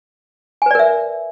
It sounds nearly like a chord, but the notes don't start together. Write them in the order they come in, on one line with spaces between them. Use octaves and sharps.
G#5 B4 D5 A#4 E5